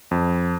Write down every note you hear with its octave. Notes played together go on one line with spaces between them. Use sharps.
F2